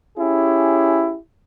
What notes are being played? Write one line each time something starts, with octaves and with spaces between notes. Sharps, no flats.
C#4 E4 G4 G#4